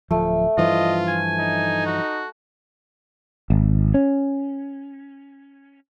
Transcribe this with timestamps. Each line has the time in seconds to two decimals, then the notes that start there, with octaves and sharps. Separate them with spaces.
0.11 D1 F3 A3
0.58 G2 E3 F3 F4 D#5
1.08 G#5
1.39 D#4
1.86 F#4
3.50 G#1
3.94 C#4